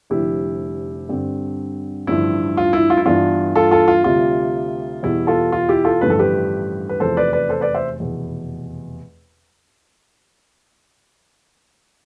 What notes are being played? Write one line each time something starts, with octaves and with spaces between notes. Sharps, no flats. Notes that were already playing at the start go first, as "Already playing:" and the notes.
F1 F2 D3 G3 E4 G4
G2 D3 G3 C4
A1 G2 D3 F3 E4
F4
E4
F4
E4
G2 E3 B3 D4 F4
F4 A4
F4 A4
F4
D2 C3 G3 F4
E2 B2 G3 E4
F4 A4
F4
E4 G4
F4 A4
A1 G2 D3 F3 A3 B4
A4
G4 B4
B4
F1 E2 C3 F3 A4 C5
B4 D5
B4 D5
A4 C5
B4 D5
C5 E5
F1 E2 B2